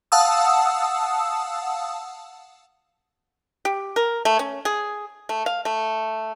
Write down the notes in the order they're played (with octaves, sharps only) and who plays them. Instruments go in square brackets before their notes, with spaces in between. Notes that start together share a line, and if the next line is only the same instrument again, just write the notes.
[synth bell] F5 F#5 A5 D#6 E6
[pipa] G4
A#4
A3
C#4
G#4
A3
F5
A3